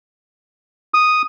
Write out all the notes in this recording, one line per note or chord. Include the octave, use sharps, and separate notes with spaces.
D#6